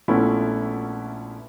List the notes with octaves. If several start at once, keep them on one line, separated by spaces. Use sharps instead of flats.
A#1 A3 B3 C#4 E4 F4